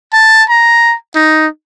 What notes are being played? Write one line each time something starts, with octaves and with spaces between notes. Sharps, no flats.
A5
A#5
D#4